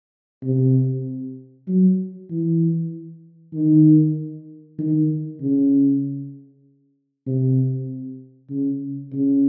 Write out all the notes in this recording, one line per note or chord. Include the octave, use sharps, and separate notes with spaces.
C3
F#3
E3
D#3
D#3
C#3
C3
C#3
C#3